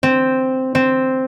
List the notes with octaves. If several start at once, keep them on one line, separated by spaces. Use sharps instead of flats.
C4
C4